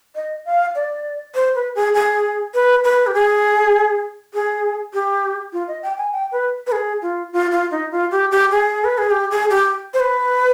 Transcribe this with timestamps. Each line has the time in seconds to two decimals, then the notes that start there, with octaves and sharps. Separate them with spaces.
0.15 D#5
0.45 F5
0.75 D5
1.35 C5
1.55 B4
1.75 G#4
1.94 G#4
2.54 B4
2.84 B4
3.07 G4
3.14 G#4
4.34 G#4
4.94 G4
5.53 F4
5.68 D#5
5.83 G5
5.98 G#5
6.12 G5
6.32 B4
6.67 B4
6.72 G#4
7.02 F4
7.32 F4
7.52 F4
7.71 D#4
7.92 F4
8.12 G4
8.31 G4
8.51 G#4
8.84 B4
8.98 G#4
9.11 G4
9.31 G#4
9.50 G4
9.94 C5
10.00 B4